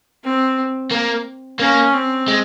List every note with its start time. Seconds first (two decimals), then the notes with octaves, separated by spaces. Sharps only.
0.23 C4
0.91 A#3
1.60 A#3 C#4
1.93 C4
2.28 G#3